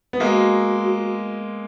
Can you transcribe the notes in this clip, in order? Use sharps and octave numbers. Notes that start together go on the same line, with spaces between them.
B3
G#3 A#3 F#4